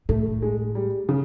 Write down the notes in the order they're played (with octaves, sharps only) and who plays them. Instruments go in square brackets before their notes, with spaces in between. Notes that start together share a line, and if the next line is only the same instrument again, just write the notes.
[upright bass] A2 [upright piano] A3
[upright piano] G#3
G3
C#3